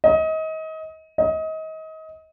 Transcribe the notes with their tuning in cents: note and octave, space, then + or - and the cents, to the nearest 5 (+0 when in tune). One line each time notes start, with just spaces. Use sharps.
D#5 +30
D#5 +30